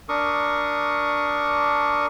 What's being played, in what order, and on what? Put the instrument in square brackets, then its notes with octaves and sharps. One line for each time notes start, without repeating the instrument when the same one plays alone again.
[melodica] D4 A#4 C#6 D#6